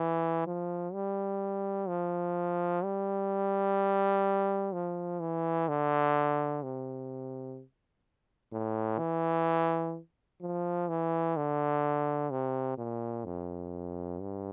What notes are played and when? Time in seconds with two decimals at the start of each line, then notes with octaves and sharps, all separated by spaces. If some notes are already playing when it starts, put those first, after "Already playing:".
Already playing: E3
0.47 F3
0.93 G3
1.88 F3
2.84 G3
4.73 F3
5.20 E3
5.68 D3
6.63 C3
8.52 A2
8.99 E3
10.41 F3
10.88 E3
11.37 D3
12.31 C3
12.78 A#2
13.25 F2
14.21 G2